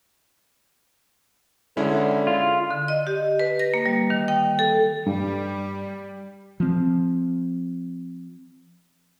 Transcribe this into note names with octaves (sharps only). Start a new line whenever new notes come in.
D3 G#3 C#4 E4
F4
D3
D#5
G4
B4
A#6
A#3
G3
D#3
G5
A4
G2 G3
F3 C4